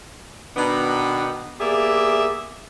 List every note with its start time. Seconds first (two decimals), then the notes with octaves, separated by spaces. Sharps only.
0.57 B2 D#3 B3 D4 D#4
1.61 A#3 B3 G4 G#4 D5 E5